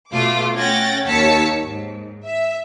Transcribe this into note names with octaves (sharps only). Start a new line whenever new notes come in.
B2 A3 F4 D6
A3 C#4 F#5 G5 A6 A#6
D#2 C#5 A5 B6 C#7
G#2
E5